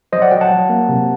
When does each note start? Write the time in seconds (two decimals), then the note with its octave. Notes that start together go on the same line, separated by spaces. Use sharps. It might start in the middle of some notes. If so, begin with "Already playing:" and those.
0.12 F#3 C5 D#5
0.22 D5 F#5
0.31 F#3 D#5 G5
0.41 F#5 A5
0.51 F#3
0.69 A#3
0.89 C3